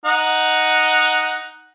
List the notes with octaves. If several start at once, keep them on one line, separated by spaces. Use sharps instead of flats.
D#4 F#5